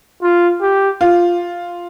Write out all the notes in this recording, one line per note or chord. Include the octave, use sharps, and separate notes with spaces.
F4
G4
F4